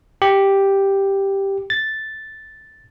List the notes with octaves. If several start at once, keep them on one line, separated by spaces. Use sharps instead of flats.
G4
A6